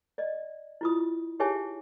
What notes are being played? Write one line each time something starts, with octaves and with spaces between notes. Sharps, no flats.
D5 D#5
E4 F4 D#6
D#4 G4 G#4 C#5 E5 G#5